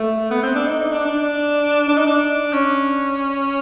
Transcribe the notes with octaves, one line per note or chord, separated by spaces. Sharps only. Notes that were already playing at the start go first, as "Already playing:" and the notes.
Already playing: A3
B3
C4
D4
D#4
D#4
D4
D4
D4
D#4
D4
C#4